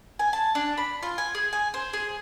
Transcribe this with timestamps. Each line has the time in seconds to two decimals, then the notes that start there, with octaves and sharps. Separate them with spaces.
0.19 G#5
0.33 A5
0.55 D4
0.78 B5
1.03 F4
1.18 G#5
1.35 G#4
1.53 G#5
1.74 C5
1.93 G#4